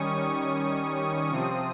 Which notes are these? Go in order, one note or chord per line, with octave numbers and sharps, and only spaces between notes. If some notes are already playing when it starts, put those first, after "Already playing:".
Already playing: D#3 G3 C#4 C#6 D#6
C#6
C3 F3 C4 D#6